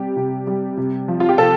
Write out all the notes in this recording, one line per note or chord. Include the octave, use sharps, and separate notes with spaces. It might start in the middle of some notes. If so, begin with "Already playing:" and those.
Already playing: C3 G3 G4
C3
G3
C3
F3
F4
G4
C3 A4